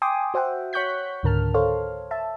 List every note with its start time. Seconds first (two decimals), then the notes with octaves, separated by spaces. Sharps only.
0.02 G5 G#5 C6 D6 D#6
0.34 F#4 C5 E5 F#5 G5
0.73 C#5 F#5 C#6 F#6 G6 B6
1.23 C#2 G#2 D3 A#4 A5 F6
1.54 A4 C5 C#5 F5
2.11 E5 A5